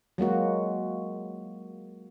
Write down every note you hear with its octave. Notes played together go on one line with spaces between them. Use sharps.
F#3 G#3 A#3 F#4